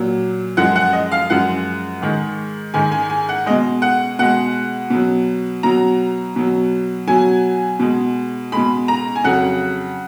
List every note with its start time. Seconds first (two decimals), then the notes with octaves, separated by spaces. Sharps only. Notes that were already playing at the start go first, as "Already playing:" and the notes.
Already playing: A#2 F#3
0.57 F#2 F3 G#3 F#5
0.76 F#5
0.93 D#5
1.12 F5
1.30 F#2 F3 G#3 F#5
2.01 G#2 D#3 G#3
2.74 G#2 D#3 G#3 G#5
2.92 G#5
3.10 G#5
3.29 F#5
3.46 B2 G#3 D#5
3.82 F#5
4.19 B2 G#3 F#5
4.90 B2 F#3
5.63 B2 F#3 A#5
6.36 B2 F#3
7.07 B2 F#3 G#5
7.80 B2 G#3
8.52 B2 G#3 B5
8.88 A#5
9.15 G#5
9.24 F2 C#3 F#3 F#5